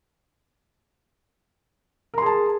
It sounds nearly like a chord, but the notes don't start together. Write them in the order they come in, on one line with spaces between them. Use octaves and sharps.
A#4 C6 G#4 A5